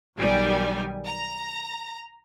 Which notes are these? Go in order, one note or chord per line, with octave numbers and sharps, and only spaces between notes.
B1 D#3 G3 G#5
A#5